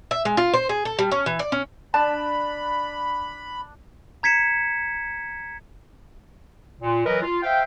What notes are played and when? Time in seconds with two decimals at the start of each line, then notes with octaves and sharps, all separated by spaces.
0.11 E5
0.25 G#3
0.37 F4
0.54 C5
0.69 G#4
0.85 A4
0.99 G3
1.12 C#4
1.26 E3
1.39 D5
1.52 C#4
1.94 D4 A5 B5
4.23 A#5 G#6 B6 C#7 E7
6.81 A#2
7.05 E3 F#3 A#4 B4 D#5
7.22 F4
7.43 C5 E5 F5 G5